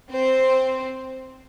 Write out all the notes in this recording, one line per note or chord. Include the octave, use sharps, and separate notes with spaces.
C4 C5